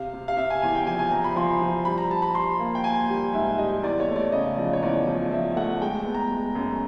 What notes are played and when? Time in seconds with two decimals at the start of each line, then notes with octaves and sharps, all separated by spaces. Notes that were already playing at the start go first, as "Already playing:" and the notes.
Already playing: C3 F5
0.13 C3
0.28 F5
0.37 C3 E5
0.50 G#5
0.62 E2 G#5
0.75 G5
0.87 F3 G#5
0.99 G#5
1.11 F3 A#5
1.24 B5
1.36 F3 C6
1.61 F3
1.85 G3 B5
1.98 A#5
2.10 G3 A5
2.22 B5
2.35 G3 C6
2.60 A#3
2.75 G5
2.84 A#3 G#5
3.10 G3
3.33 G#2 E5
3.58 G3 D#5
3.83 E2 D5
4.00 C#5
4.09 A3
4.16 D5
4.32 C#3 D#5
4.57 F3 D5
4.73 C#5
4.82 E2 D5
5.07 F3
5.31 F3 E5
5.56 A3 F#5
5.81 G#3 G5
6.05 B3
6.15 A#5
6.31 G#3
6.55 F#2